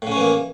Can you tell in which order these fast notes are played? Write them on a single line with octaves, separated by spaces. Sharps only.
A2 C#3 C#4 E3 A#3